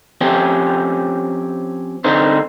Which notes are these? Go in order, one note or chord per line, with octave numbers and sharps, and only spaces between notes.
F3 C4 C#4 G4
D3 C4 D#4 C5